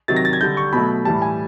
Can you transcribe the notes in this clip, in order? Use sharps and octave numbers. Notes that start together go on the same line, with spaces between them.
C3 D#3 F#3 A6
A#6
A6
G#6
D3 G3 G6
C#6
B2 F#3 A3 B5
A2 E3 G3 A5
G#5